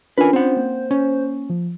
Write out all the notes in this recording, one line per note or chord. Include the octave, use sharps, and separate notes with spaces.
C#4 D4 F4 A#4 B4 G#5
C4 C5 F#5
A#3
C#4
F3